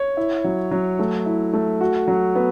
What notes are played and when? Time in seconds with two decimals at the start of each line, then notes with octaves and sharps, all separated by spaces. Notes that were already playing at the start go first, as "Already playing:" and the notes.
Already playing: C#5
0.17 E4
0.44 F#3
0.71 F#3
0.99 A3
1.26 E4
1.53 A3
1.81 F#4
2.08 F#3
2.35 B3